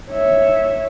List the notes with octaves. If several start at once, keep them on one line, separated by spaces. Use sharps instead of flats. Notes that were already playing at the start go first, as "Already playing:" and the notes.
C#5 E5